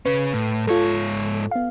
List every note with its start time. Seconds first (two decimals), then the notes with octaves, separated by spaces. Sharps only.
0.06 C#3 C#4 B4
0.34 A2
0.67 G#2 F4 A4 C#5
1.51 B3 F5